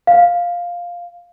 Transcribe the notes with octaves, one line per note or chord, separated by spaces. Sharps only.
F5